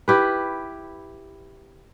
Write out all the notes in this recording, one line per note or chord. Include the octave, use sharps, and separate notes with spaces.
E4 G4 B4